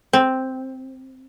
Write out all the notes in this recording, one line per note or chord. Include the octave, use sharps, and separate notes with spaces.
C4